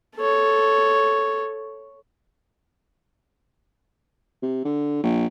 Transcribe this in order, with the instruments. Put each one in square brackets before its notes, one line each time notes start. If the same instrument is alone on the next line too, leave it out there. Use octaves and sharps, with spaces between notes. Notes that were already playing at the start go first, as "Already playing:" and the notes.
[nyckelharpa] A4 C#5
[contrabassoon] C3
D3
A#1